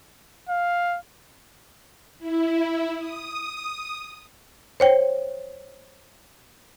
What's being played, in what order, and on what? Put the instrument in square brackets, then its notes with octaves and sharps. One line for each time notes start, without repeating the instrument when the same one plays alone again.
[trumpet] F5
[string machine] E4
D#6
[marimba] C5 C#5 G5